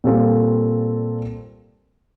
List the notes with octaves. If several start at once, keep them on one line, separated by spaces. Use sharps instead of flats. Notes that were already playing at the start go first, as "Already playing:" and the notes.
A#2 G3 C4 F4 A4